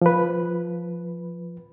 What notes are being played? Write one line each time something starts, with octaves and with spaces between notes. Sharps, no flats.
F3 B4